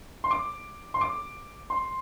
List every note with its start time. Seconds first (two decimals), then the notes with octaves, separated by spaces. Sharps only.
0.24 C6
0.31 D6
0.94 C6
1.01 D6
1.70 C6